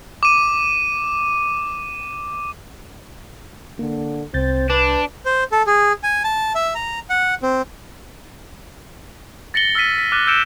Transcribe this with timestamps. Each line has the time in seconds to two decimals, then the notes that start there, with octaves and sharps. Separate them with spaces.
0.23 D6 D#7
3.79 D3 A#3
4.34 C2 C4 G6 A6
4.70 D4 B4
5.25 C5
5.52 A4
5.67 G#4
6.03 G#5
6.24 A5
6.55 E5
6.75 A#5
7.10 F#5
7.43 C4
9.54 A6 A#6 C#7 F#7 G7
9.75 E6 F6 A6 B6 D#7
9.98 B6
10.12 D6 F6 F#6 A6 D#7
10.27 E6 G6 C#7 D7 E7